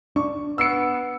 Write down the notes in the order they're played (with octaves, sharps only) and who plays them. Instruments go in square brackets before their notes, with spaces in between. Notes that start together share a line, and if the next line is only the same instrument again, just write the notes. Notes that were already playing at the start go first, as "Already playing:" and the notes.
[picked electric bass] D4 [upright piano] C#6
[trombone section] B3 [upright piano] E6 C7 C#7